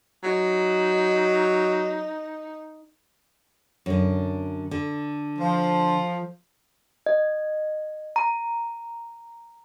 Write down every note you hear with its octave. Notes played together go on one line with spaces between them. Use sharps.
F#3 D#4
F#2 D3
D3
F3
D#5
A#5